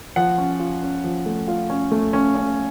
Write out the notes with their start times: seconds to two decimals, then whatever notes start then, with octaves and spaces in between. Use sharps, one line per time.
0.16 F3 F#5
0.38 C#4
0.59 F4
0.82 C#4
1.04 F3
1.26 A3
1.48 F4
1.70 C#4
1.91 A3
2.13 C#4
2.35 C#4